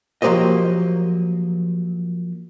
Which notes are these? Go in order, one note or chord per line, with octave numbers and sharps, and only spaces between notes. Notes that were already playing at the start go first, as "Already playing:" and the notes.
F3 F#3 A#3 G4 C5 D#5